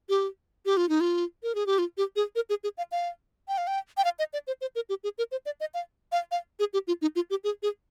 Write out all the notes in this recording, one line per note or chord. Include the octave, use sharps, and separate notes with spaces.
G4
G4
F4
D#4
F4
A#4
G#4
G4
F4
G4
G#4
A#4
G#4
G#4
F5
F5
G5
F5
G5
G5
F5
D#5
D5
C5
C5
A#4
G4
G#4
A#4
C5
D5
D#5
F5
F5
F5
G#4
G4
F4
D#4
F4
G4
G#4
G#4